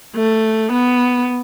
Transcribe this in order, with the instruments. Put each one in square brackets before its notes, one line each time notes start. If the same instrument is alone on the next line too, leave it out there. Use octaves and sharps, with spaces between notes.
[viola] A3
B3